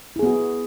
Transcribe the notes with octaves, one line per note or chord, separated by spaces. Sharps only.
B3 E4 F#4 G#4